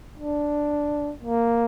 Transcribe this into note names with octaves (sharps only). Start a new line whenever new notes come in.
D4
A#3